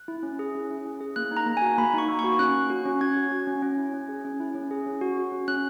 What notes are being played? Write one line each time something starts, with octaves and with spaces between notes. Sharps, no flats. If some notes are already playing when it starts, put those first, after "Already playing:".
Already playing: F#6
E4
C#4
G#4
C#4
E4
C#4
G#4
A#3 F#6
D#4
A#5
A#3
F#4 G#5
A#3 B5
D#4 C#6
A#3
C#6
F#4
C#4 F#6
F#4
F#4
C#4
C#4 G#6
F#4
F#4
C#4
C#4
E4
C#4
G#4
C#4
E4
C#4
G#4
C#4
F#4
F#4
C#4
C#4 F#6